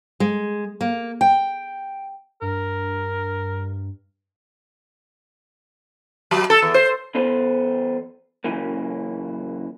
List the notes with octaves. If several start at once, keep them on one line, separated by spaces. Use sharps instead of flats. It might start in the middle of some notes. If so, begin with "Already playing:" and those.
G#3
A#3
G5
G2 A#4
F#3
A4
E2
C5
E2 B3 A4 C5
F#2 A2 C#3 E3 A#3